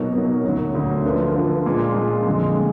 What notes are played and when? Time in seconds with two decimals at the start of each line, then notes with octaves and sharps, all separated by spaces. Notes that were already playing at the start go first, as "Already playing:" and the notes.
Already playing: B2 F#3 A#3 D#4
0.13 B2 F#3 A#3 D#4
0.44 D2 D3 F#3
0.74 D2 D3 F#3
1.04 D3 F3 A#3 F4 B4
1.35 D3 F3 A#3 F4 B4
1.66 A#2 G#3 D4 F4
1.95 A#2 G#3 D4 F4
2.26 F2 D3 G#3
2.57 G#3